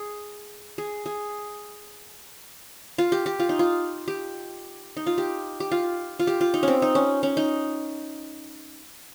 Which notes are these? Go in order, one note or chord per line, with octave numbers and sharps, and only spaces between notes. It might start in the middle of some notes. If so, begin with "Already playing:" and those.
Already playing: G#4
G#4
G#4
F4
G4
G4
F4
D#4
F4
G4
D#4
F4
G4
G4
F4
F4
G4
F4
D#4
C4 C#4
D#4
C#4
C#4
D#4